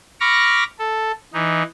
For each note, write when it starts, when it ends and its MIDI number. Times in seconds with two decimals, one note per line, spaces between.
0.20 0.64 83
0.20 0.64 85
0.20 0.64 86
0.20 0.64 89
0.20 0.64 94
0.79 1.12 69
1.33 1.63 52
1.33 1.63 63